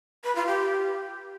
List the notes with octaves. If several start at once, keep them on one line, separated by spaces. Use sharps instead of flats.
B4
F4
G4